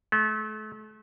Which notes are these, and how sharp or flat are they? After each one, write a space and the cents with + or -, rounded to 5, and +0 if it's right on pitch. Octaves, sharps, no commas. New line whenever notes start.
A3 -35